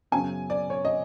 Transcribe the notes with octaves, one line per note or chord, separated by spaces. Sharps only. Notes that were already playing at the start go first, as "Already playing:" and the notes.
F#2 C#3 F#3 B3 G#5
D5
C#5
D#5